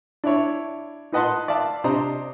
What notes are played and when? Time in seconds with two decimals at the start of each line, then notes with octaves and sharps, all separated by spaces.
0.24 D4 E4 C#5
1.12 D#4 B4 D#5 F#5 A5 C6
1.48 D5 E5 F5 A5
1.84 C3 D4 C5 D#5 A#5